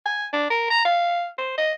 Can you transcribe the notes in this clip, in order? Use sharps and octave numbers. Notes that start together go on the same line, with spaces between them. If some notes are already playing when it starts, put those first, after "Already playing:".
G#5
D4
A#4
A#5
F5
C5
D#5